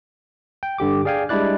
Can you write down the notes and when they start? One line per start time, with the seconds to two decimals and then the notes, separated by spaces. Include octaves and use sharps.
0.63 G5
0.78 G2 D3 G4 D6
1.05 G#4 D5 F5 G5 G#5
1.29 G3 G#3 D4 E4 D5 F#6